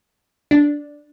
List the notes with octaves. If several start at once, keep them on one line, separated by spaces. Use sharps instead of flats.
D4